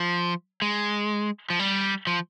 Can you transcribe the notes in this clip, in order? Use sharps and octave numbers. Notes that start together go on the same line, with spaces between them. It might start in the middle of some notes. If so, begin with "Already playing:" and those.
Already playing: F3
G#3
F3
G3
F3